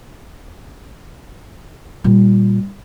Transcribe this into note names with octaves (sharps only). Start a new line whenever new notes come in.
A#2 G3